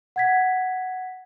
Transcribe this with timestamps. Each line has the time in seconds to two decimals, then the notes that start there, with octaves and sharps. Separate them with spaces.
0.16 F#5 G#6 B6